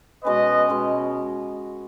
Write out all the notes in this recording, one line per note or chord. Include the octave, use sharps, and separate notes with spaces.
B2 G#3 C#4 B4 D#5
B2 G#3 C#4